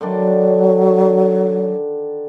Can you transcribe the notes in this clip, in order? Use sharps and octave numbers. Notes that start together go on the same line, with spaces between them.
D3 D#3 F#3 D4